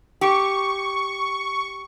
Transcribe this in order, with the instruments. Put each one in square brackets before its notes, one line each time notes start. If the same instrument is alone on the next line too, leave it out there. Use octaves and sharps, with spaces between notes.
[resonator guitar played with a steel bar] G4 [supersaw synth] C#6